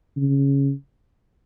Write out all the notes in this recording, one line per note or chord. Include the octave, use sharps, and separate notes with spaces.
C#3